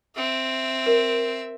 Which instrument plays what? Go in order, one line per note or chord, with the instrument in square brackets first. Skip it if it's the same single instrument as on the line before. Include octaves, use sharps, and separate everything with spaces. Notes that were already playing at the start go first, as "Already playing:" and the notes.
[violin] C4 E5
[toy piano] A#4